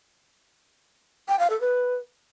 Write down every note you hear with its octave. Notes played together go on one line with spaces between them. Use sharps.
G5
F5
A4
B4